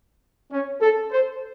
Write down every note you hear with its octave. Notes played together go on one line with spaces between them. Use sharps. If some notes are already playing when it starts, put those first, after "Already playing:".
C#4
A4
C5